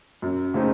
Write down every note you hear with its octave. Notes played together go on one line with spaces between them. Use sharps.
F#2
C#3 A3 C4 D#4